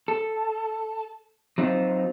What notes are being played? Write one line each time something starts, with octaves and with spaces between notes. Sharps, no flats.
A4
F#3 C4 D#4 F4